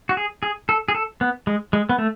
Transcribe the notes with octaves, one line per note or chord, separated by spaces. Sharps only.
F#4
G#4
G#4
A4
G#4
A4
B3
G#3
G#3
B3
A3